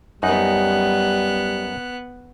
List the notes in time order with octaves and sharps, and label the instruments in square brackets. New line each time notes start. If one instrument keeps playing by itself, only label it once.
[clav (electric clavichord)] F#2 D#4 [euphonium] G3 [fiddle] B3 F#6